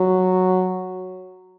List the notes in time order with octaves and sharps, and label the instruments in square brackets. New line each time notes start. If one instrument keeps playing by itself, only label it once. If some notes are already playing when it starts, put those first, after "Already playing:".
Already playing: [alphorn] F#3